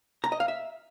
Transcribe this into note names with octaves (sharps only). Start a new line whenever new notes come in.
A#5
D#5
F5
E5